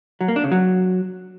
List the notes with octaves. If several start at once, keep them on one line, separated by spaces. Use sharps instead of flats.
F#3
A#3
D4
C#3
F#3